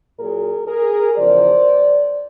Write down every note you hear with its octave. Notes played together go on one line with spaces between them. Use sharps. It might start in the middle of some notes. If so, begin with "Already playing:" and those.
A#2 F#3 G#4 A#4
G#4 A#4
E2 C#3 F3 C5 D5